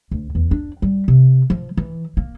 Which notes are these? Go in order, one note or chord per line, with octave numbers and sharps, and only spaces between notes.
D2
E2
D4
G3
C3
F3
E3
A#3